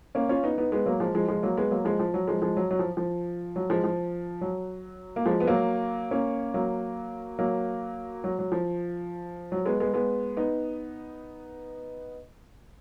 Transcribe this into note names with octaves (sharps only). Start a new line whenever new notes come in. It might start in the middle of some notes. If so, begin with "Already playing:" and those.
A#3 C#4
C#4 F4
B3 D#4
B3 D#4
G#3 B3
F#3 A#3
F3 G#3
F3 G#3
F3 G#3
F#3 A#3
G#3 B3
F#3 A#3
F3 G#3
F3
F#3
F3 G#3
F3 G#3
F#3
F#3
F3
F3
F#3
F3 G#3
F3
F#3
A#3
F3 G#3
B3
F#3 A#3
A#3 C#4
F#3 A#3
F#3 A#3
F#3
F#3
F3
F#3
G#3 B3
G#3 B3
G#3 B3
B3 D#4